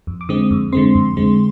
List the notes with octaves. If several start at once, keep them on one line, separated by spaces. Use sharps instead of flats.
F2
D6
D3 G#3 C4 D#6
F2
D3 G#3 C4 C6
F2
D3 G#3 C4